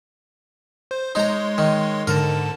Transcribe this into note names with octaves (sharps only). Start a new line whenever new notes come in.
C5
G#3 D#4 C#5 A#5 C6
D#3
G#2 D3 A#4 A5